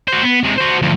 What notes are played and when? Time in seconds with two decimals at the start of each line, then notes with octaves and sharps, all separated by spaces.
0.08 F#4 C5
0.23 B3
0.44 C3 G#3
0.58 F#4 C5
0.82 D2 F3